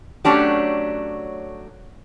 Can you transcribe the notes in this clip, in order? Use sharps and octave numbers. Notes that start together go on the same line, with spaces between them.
F#3 A3 C#4 D4 G4